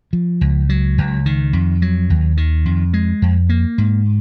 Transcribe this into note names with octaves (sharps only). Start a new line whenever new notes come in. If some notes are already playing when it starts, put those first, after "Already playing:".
F3
C#2
F#3
C#2
D#3
F2
F#3
D#2
D#3
F2
G#3
F2
A#3
G#2